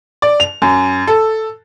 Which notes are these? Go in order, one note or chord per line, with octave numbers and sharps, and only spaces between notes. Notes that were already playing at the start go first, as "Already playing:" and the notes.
D5
F7
F#2
A4